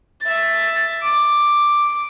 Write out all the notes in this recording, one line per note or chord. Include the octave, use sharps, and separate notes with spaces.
E5 A6
D6